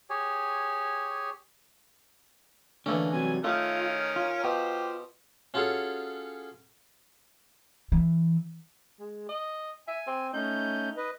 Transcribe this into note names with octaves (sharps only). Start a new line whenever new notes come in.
G4 G#4 C#5 G#5
D3 E3 A3 A#3 C#4 D4
C3 F#3 G3 G#5
D#3 A3 C#4 F4 A#4
F4
B2 G4 C5
C#4 F4 F#4 G#4 A4 C#5
E3
G#3
D#5
E5 G#5
C4
A3 C#4 D#4 G6
B4 D#5